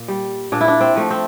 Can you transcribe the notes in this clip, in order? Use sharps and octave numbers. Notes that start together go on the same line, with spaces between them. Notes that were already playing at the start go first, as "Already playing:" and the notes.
Already playing: A#2
G3
A#2 D4
E4
D4
C4
F3 A3
C4